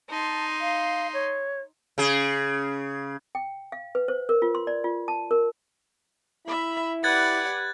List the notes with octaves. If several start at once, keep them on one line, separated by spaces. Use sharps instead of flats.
D#4 A5 C6
F5
C#5
C#3 G#4
G5
F5
B4
C5
A#4
F4
C6
D5
F4
A5
A#4
E4 E5 B5
G4 B4 D5 F#5 F#6 G#6 A6